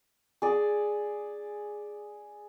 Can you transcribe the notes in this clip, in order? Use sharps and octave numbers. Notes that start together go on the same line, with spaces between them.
G#4 D5